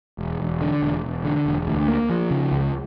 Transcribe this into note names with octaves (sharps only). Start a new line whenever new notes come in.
E1
E1
D3
E1
E1
D3
E1
D2
A#3
F3
C#3
C#2